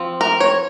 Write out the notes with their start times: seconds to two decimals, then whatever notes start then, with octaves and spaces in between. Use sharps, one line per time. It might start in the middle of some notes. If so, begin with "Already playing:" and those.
Already playing: F3 C4
0.21 A#4
0.40 C#5